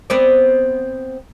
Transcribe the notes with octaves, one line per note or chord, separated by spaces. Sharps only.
B3 C4 D5